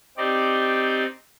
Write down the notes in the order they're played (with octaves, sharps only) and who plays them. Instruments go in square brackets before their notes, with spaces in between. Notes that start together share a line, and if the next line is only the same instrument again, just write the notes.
[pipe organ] C4 D#4 G4 D5